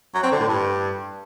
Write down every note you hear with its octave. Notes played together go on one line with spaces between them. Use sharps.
F#3
C4
D3
A2
G2